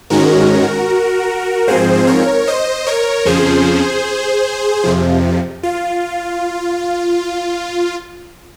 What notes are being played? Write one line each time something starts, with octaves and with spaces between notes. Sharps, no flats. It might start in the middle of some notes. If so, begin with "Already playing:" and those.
G#2 D#3 G#3 C#4 F#4 A#4
G#2 F3 C4 G#4 C5
A#4 C#5
C5 D#5
A#4 C#5
F2 C#3 F3 G#4 C5
F2 C3 F3
F4